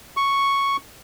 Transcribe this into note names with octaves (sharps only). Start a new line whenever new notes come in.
C#6